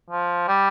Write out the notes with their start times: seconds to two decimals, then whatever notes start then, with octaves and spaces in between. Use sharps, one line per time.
0.10 F3
0.48 G3